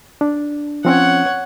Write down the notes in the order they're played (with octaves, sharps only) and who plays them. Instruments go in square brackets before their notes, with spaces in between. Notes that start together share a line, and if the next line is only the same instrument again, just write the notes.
[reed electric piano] D4
[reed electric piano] F3 C4 C#4 [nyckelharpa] C#5 F#5